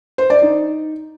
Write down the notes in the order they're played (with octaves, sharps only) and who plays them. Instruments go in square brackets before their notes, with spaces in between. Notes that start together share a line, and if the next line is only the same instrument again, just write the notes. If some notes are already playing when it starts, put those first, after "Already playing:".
[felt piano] C5
D5
D#4